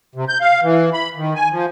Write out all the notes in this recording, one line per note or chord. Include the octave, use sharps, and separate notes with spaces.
C3
G6
F5
E3
B5
D#3
G#5
F3